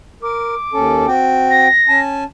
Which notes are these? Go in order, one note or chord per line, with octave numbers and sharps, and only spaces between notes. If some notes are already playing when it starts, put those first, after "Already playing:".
A#4 D6
D#2 C#4 A4
C4 F#4 G5
A#6
C#4 G#5 A5